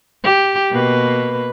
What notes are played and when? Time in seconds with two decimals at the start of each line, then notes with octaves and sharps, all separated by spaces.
0.23 G4
0.72 B2 A#3 B4